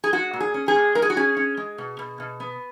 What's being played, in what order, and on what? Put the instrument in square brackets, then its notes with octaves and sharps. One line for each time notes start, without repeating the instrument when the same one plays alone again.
[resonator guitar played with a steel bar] G#4
G#3 F#4
A#2
G#4
C#4
G#4
A#2
G#3 A#4
G#4
F#4
C#4 G#4
C#4
G#3
B2
B2
B2
B3